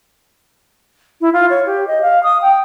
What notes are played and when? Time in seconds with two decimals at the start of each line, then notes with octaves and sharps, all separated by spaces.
1.21 E4
1.33 F4
1.50 C#5
1.66 G4
1.88 D#5
2.02 F5
2.23 D#6
2.42 G5